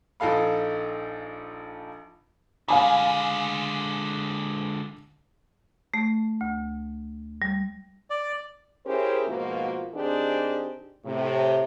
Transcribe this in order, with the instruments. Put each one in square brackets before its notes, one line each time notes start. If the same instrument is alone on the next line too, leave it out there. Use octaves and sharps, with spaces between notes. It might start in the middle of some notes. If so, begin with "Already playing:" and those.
[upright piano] A#1 D#4 A4 F5 B5
[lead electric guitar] D3 G#3 [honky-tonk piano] F5 G#5 B5
[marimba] A3
D2
G3
[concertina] D5
[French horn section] C#4 E4 G4 G#4 A#4 C5
G#2 B2 F3 A#3 F4 F#4
D#3 C4 D4 D#4 G4 G#4
A2 C3